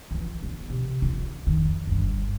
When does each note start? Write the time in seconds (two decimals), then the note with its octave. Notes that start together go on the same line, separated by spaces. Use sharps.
0.11 E3 F4
0.43 B3
0.70 C3
1.02 F4
1.47 F2 D#3
1.87 G1 G2